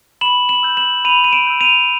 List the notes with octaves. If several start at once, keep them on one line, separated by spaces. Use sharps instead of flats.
B5 E7 F#7
E7 F#7
E6 G6
E7 F#7
B5 D#7 F7
D#7
D7 E7
E6 G6
D#7 F7